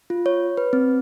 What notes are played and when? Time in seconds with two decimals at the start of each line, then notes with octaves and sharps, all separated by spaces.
0.10 F4
0.26 C#5
0.57 B4
0.73 C4